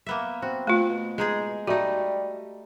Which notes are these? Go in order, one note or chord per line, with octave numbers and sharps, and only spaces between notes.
A#3 B3 E5
C4 F#4
A3 F4
B2
G#3 D#4 G#4
G3 A3 D#4 F#4